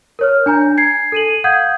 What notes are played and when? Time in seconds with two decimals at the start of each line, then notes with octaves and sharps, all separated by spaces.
0.19 A#4 C#5 F6
0.46 D4 G#5 A#5 G6
0.77 G#5 G#6 C7
1.12 A4 D#7 F#7
1.44 F5 F#5 D#6 G6 G#6